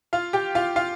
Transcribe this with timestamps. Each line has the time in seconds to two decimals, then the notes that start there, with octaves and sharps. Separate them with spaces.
0.13 F4 F5
0.33 G4 G5
0.55 F4 F5
0.76 F4 F5